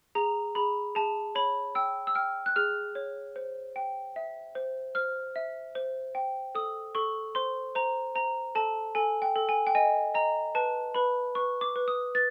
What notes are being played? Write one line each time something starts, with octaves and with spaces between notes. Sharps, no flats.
G#4 A#5
G#4 B5
G#4 A5
C#5 B5
G5 E6
E6
G5 F6
F#6
G#4 F6
C#5
C5
G5
E5
C5
C5 F6
E5
C5
G5
A4 D#6
A4 C#6
C5 C6
C5 A#5
C5 A#5
A4 A5
A4 G#5
G5
A4
G#5
G5
D#5 G#5
D#5 A#5
B4 A5
B4 B5
B4 C#6
D6
B4
D#6
B4 A6